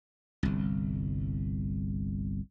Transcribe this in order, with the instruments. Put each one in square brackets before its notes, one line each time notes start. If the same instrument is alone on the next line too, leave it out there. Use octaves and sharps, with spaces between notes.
[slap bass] G1 C2